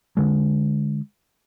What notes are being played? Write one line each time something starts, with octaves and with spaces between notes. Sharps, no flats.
D3 G#3